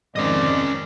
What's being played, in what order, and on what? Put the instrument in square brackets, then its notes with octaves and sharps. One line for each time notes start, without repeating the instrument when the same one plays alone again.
[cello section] F2 D#3 [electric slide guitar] G#2 G#3 C4 [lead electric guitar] C#4 D#5 [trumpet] D5